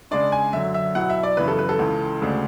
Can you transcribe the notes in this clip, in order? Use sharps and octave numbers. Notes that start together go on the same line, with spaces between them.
C#3 G#3 D4 D5
G#5
F#2 D3 F#3 E5
E5
B2 F#3 B3 E4 F#5
E5
D5
F#2 C#3 E3 B3 E4 B4
A4
B4
A4
C#2 C#3 E3
D2 C#3 G#3 D4